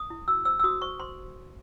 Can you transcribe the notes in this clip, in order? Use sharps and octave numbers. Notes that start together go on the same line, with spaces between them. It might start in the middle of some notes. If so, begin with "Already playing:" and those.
Already playing: D#6
E4
F#4 E6
C5 E6
E6
F#4 D#6
C5 C#6
C5 C6